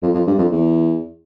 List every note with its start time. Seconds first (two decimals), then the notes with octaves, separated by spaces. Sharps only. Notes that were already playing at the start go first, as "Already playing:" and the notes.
0.03 F2
0.14 F2
0.27 G2
0.38 F2
0.51 E2